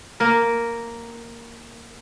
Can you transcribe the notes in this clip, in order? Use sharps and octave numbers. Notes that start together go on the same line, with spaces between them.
A#3 A#4